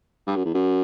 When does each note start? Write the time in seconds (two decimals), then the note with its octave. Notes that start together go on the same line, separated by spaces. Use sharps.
0.27 G2
0.36 F#2
0.45 E2
0.54 F#2